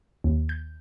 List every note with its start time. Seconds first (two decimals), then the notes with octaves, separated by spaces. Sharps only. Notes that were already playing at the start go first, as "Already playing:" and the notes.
0.24 D#2
0.49 G6